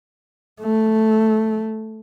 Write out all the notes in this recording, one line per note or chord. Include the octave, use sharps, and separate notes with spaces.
A3